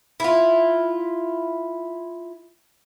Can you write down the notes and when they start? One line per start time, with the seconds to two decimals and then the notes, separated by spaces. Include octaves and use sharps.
0.20 E4 F4